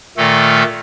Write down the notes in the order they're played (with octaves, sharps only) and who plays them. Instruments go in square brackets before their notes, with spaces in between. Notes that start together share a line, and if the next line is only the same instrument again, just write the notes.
[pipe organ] A#2 D#3 A3 A4